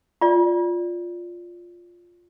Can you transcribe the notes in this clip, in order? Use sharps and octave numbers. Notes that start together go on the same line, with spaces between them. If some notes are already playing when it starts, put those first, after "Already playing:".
F4 D5